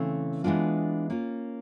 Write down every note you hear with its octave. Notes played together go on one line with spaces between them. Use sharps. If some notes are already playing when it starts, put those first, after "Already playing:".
Already playing: C#3 E3 A3 C4
E3 G#3 B3 D4 F4
A#3 C#4 F4